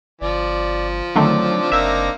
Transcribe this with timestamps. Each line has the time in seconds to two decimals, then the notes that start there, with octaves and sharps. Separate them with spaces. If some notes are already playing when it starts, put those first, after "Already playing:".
0.21 G1 F3 D5
1.16 D3 D#3 F#3 A3 C4 D4 D6
1.72 F#1 A#3 D#4 E5